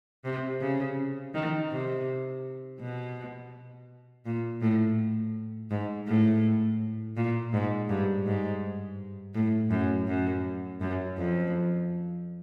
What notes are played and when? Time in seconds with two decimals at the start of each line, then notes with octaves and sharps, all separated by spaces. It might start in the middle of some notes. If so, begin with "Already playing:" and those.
0.25 C3
0.61 C#3
1.34 D#3
1.71 C3
2.80 B2
4.26 A#2
4.61 A2
5.70 G#2
6.07 A2
7.17 A#2
7.53 G#2
7.89 G2
8.26 G#2
9.35 A2
9.70 F#2
10.07 F#2
10.81 F#2
11.17 F2